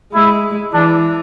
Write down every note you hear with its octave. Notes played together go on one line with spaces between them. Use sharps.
G#3 E4
E3 D4